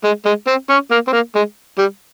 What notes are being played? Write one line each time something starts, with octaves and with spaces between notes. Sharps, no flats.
G#3
G#3
C4
C#4
A#3
C4
A#3
G#3
G3